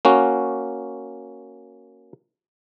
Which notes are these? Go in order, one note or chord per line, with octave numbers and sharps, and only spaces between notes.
A#3 C#4 F#4